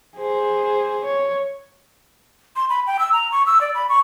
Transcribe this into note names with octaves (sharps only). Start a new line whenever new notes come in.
G#4 C5
C#5
C6
B5
G5
E6
A#5
C#6
E6
D5
B5
C#6